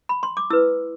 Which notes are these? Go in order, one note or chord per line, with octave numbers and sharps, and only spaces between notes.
B5
C6
D6
E4 B4 E6